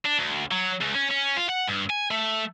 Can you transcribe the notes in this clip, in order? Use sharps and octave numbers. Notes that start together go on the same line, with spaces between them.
D4
D2
F#3
C#2
C#4
C#4
F4
F#5
G2
G#5
A3